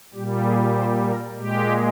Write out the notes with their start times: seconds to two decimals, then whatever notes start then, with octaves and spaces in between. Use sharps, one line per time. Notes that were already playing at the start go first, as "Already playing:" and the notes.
0.14 A#2 G3 G4
0.45 G#4
0.75 C5
1.06 A#4
1.36 A#2 G#3 G4